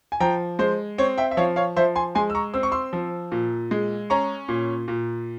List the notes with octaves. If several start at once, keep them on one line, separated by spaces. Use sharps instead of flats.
G#5
F3 G5 A#5
G#3 C5
C4 C#5
E5 G5
E5
F3 C#5 F5
C#5 F5
F3 C5 E5
G#5 C6
G#3 G#5 C6
E6
A#5 C#6
C4 E6
C#6
C6 E6
F3
A#2
G#3
C#4 A#5 C#6
A#2
A#2